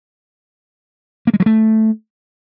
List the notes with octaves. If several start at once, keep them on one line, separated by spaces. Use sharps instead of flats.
A#3
G#3
F#3
A3